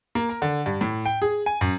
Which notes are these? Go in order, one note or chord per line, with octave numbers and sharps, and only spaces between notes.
A#3
A#4
D3
G2
A2
G5
G#4
G#5
F#2